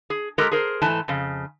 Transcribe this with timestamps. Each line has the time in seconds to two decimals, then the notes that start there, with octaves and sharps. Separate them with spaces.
0.10 G#4
0.38 G#3 G4 A4 A#4
0.52 G#4 A#4 C5
0.82 G#2 E3 A3 G#5 A5
1.08 F2 C#3